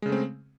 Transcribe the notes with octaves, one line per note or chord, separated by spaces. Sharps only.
C#3 G#3 A3 C4